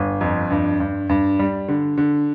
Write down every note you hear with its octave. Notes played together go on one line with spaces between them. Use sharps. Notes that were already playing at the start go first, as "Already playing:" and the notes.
Already playing: G1
F2
G2
G2
G2
G3
D3
D3